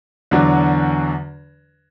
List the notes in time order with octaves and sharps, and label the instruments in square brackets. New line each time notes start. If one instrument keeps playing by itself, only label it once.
[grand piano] E2 D3 F#3 D4 F#4